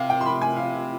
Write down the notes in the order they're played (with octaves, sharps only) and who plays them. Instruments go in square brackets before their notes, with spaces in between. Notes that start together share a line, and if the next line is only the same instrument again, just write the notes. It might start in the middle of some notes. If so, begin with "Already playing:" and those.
Already playing: [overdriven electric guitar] C3 [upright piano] F5
[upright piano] G5
C6
B5
G#5
F5